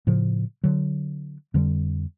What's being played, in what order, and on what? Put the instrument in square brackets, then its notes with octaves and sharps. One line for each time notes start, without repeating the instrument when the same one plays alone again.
[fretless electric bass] A2 C#3 F3
D3 F#3
F2 D3 G3